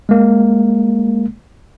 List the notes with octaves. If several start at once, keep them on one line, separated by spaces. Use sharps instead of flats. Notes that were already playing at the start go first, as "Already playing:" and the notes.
G#3 A#3